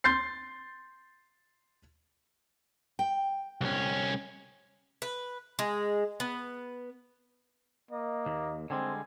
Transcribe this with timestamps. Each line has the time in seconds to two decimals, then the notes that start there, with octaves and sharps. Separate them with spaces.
0.04 C6 G6 A6 C7
2.99 G5
3.61 C2 C#4
5.02 B4
5.59 G#3
6.20 B3
7.91 A#3 D#5
8.26 D#2
8.70 D3 G3 G#3 C4 G#5